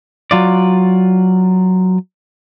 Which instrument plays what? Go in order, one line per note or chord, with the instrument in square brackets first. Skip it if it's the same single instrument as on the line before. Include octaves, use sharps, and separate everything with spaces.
[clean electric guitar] F#3 F4 D5